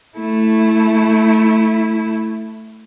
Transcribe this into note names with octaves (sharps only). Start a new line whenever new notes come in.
A3 E4